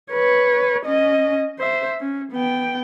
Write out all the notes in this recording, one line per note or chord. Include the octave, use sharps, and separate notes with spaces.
B4 C#5
C#4 D#5
C5 E5
C#4
B3 G5